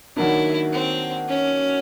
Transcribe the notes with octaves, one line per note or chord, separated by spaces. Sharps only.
D#3 F#3 A#3 D4 E4
C4
C#4